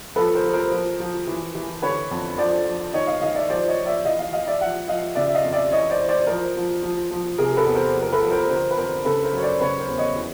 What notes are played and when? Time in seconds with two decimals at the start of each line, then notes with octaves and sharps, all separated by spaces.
0.16 F3 A4 B4
0.35 A#4 C5
0.44 F3
0.53 A#4 C5
0.71 F3
1.00 F3
1.27 E3
1.55 E3
1.82 D3 B4 C#5
2.11 F2
2.38 F3 C5 D5
2.66 F3
2.93 D#3 C#5 D#5
3.07 D#5 F5
3.22 D#3 D#5 F5
3.35 D5 E5
3.49 F3 C5 D5
3.68 C#5 D#5
3.77 F3
3.86 D5 E5
4.05 E3 D#5 F5
4.19 D#5 F5
4.32 E3 D#5 F5
4.47 D5 E5
4.60 F3 E5 F#5
4.88 F3 D#5 F5
5.16 C#3 D5 E5
5.27 E5
5.34 D#5 F5
5.44 F2
5.53 D5 E5
5.71 E3 C#5 D#5
5.90 C5 D5
5.99 E3
6.09 C5 D5
6.27 F3 A#4 C5
6.56 F3
6.82 F3
7.11 F3
7.38 C3 G#4 A#4
7.57 A4 B4
7.66 E2
7.75 A#4 C5
7.94 F3
8.03 A#4
8.12 A4 B4
8.22 F3
8.30 A#4 C5
8.50 D3 A#4 C5
8.71 B4
8.77 F2 A#4 C5
9.05 C#3 A4 B4
9.24 A#4 C5
9.33 F#2 C#5
9.43 C5 D5
9.60 C#3 B4 C#5
9.79 A#4 C5
9.88 E2
9.98 C#5 D#5
10.16 E3